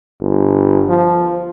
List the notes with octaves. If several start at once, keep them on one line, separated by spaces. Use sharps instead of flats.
G1
F3